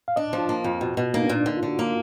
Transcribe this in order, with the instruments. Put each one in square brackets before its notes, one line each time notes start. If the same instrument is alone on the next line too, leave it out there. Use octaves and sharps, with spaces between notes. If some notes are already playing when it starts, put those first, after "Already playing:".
[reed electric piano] F5
[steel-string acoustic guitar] D4 [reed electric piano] D#5
[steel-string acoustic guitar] F3
[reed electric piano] F4
[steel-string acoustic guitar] A#3
F2
B2
B2
[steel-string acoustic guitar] A#3 [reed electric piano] D#4
[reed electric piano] D4
[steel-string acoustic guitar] A#2
[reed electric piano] D4
[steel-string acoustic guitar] D3 [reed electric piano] D#4
[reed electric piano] F4
[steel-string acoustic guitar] D3 [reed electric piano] F#4
[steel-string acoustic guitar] A#3